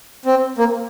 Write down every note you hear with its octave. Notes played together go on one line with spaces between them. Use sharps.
C4
A#3